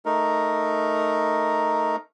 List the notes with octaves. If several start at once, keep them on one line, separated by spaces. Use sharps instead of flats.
A3 D#4 A#4